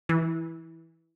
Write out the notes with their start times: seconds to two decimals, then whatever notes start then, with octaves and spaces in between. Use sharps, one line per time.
0.09 E3